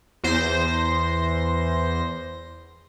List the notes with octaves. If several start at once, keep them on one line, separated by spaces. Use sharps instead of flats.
E2 C5 A#6